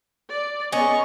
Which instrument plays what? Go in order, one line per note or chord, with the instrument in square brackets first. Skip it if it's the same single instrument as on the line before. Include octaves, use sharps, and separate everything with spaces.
[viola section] D5
[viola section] B3 G#4 [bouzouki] C#4 [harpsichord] D#5 [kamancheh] C#6